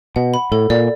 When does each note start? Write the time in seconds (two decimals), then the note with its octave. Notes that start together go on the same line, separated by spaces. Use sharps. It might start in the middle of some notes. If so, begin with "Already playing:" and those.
0.16 B2 F#5
0.34 B5
0.52 A2 A4
0.70 A#2 D5